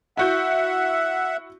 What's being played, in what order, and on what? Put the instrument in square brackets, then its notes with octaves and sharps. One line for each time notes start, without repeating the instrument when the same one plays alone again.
[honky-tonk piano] E4 F#4 G6 [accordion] E5 F#5